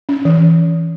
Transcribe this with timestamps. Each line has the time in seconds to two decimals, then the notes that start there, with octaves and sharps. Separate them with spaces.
0.09 C#4
0.25 E3